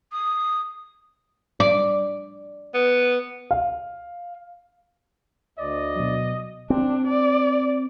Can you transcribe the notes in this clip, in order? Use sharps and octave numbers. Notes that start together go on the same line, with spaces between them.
D#6
D5
B3
F5
D2 D5 D#5
B2 F#3
C4 D4
D5